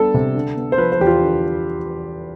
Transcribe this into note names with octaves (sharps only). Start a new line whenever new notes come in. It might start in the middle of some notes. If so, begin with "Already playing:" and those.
Already playing: G3 B3 D4 A4
C3
D3
B3
C5
F3 B4
C5
E2 G4
F4
D3